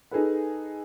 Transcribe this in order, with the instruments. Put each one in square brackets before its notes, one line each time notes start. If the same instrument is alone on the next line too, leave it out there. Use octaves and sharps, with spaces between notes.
[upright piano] D#4 G#4 A4 B4